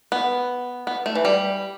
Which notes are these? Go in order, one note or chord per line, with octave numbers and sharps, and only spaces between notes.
B3
B3
A3
E3
G3